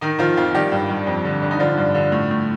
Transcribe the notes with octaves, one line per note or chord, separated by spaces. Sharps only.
D#3 D#4
D#3 F3 F4
F2 F3 F4
D#3 G3 G4
G2
G2
F2
D3
D3
D#4
D3 F3 F4
G2
D3
A2
A2